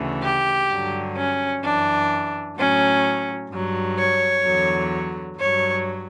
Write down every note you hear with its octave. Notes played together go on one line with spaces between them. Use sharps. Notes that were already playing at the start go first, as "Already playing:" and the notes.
Already playing: D2 C#3 E3
G4
G2 D3 F#3
C#4
F#2 E3 D4
A2 F#3 C#4
G2 F#3
C#5
E2 D3 F#3
G2 F#3 C#5